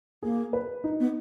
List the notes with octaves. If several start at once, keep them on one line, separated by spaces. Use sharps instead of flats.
A#3 G#4
B4
D#4
B3